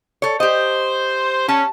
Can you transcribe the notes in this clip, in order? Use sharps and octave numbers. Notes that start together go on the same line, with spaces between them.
A4 C#5
G4 C5 D#5
C#4 A5